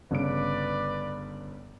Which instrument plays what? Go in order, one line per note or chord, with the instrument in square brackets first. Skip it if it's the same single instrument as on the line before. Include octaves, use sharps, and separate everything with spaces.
[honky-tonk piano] G1 C#3 D7 [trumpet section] B4 D5